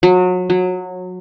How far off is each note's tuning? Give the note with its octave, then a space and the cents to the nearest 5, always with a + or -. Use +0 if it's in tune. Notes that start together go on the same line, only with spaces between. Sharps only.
F#3 -30
F#3 -20